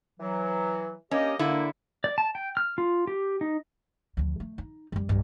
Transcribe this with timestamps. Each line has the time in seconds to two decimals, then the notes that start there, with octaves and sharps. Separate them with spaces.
0.20 E3 F#3
1.11 A#3 C#4 G4 D#5
1.39 D3 A#3 E4
2.04 D5
2.18 A5
2.35 G5
2.57 F6
2.78 F4
3.07 G4
3.41 D#4
4.17 D2 F3
4.40 A3
4.58 D#4
4.92 F#2 G3
5.09 B1 G2